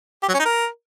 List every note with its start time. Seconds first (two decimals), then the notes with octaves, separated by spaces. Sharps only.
0.23 G4
0.28 F#3
0.34 C#4
0.40 D#4
0.45 A#4